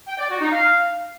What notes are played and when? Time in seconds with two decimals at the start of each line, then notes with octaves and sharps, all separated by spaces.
0.08 G5
0.19 D5
0.30 F#4
0.41 D#4
0.53 F5